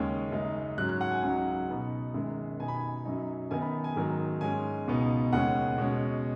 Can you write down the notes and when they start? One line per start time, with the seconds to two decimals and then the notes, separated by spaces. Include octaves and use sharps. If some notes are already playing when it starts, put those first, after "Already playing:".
Already playing: D#2 C#3 G#3 C#4
0.32 F#2 C#3 G#3 D#4
0.78 G#2 F#3 C#4 F#6
0.89 F#6
1.01 F#5
1.11 G#5
1.23 C#2 C#3 F#3 D#4 F#5
1.69 B2 B3 D#4
2.14 F#2 D#3 G#3
2.59 B2 B3 D#4 G#5
2.68 B5
2.77 G#5
3.05 F#2 F#3 D#4
3.50 F#2 D#3 B3 D#4 G#5
3.62 B5
3.84 G#5
3.96 G#2 D#3 F#3 D#4
4.41 G#2 G#3 C#4 G#5
4.87 C#2 B2 B3 D#4
5.33 D#2 C#3 G#3 C#4 F#5
5.78 B2 G#3 C#4